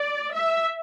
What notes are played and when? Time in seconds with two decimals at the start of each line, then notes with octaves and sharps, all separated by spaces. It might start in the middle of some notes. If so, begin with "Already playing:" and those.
Already playing: D5
0.34 E5